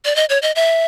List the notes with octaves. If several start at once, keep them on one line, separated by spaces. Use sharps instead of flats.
D5
D#5
C#5
D#5
E5